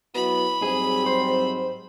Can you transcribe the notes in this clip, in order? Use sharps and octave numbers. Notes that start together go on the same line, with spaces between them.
F#3 B3 E4 F#4 B5
G#2 F#3 G3 C4 G#4
C5